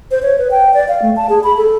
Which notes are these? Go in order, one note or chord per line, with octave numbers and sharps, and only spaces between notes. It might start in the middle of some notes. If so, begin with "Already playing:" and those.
C5
C#5
B4
G5
D5
F5
A3
A5
G#4
B5
A4